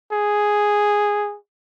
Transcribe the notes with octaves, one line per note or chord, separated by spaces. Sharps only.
G#4